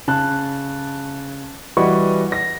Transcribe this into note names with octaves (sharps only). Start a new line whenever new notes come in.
C#3 A5 F#6
E3 G3 F#4 D#5 C#6
A#6